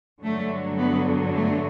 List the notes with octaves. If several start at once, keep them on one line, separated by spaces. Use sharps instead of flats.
G2 D3 F#3 A3
B3
A3